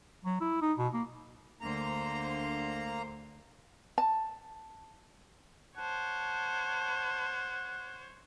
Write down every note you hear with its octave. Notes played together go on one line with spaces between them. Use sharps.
F#3
E4
D#4
B2
A#3
D2 D3 A#3 C5 A#5
A5
C5 C#5 F#5 A5